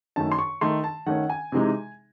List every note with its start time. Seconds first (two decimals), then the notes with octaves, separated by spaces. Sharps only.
0.16 F#2 D#3 A3 A5
0.32 C6
0.39 C#6
0.61 D#3 A3 D#4 C6
0.84 A5
1.06 D#3 A3 C#4 F#5
1.30 G#5
1.52 C3 E3 G#3 D#4